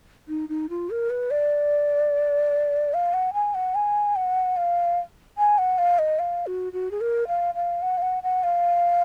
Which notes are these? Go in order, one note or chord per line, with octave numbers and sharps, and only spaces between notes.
D#4
D#4
F4
A#4
B4
D5
F5
F#5
G#5
F#5
G#5
F#5
F5
G#5
F#5
F5
D#5
F5
F#4
F#4
G#4
A#4
F5
F5
F#5
F5
F#5
F#5
F5